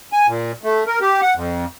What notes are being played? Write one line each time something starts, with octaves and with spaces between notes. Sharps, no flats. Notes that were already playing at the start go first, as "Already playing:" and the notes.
G#5
A#2
A3
A#4
G4
F#5
F2